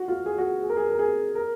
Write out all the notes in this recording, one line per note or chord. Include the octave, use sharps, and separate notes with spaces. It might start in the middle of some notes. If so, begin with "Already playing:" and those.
Already playing: F#4
F4
G#4
F#4
G#4
A#4
G#4
A#4
G#4
A#4